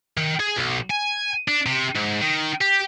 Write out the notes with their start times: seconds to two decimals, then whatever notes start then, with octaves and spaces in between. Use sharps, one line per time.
0.17 D#3
0.40 G#4
0.56 B1
0.90 G#5
1.48 D4
1.66 C3
1.95 G#2
2.22 D#3
2.61 G4